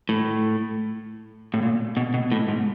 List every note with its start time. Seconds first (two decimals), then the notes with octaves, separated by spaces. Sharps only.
0.09 A2
1.54 A2
1.63 A#2
1.97 B2
2.14 B2
2.31 A2
2.48 G#2